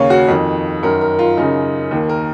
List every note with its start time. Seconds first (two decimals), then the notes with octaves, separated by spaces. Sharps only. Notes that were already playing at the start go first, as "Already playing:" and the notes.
Already playing: D#2 C#3 C#5 F5
0.10 F#4
0.28 F2 D#3
0.83 F#2 D#3 A#4
1.01 A#4
1.19 F4
1.37 F#2 C#3 D#4
1.91 D#2 D#3
2.09 A#4